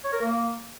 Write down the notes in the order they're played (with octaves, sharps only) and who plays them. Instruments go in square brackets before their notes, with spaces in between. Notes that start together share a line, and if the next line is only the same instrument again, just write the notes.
[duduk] C#5
A#4
A#3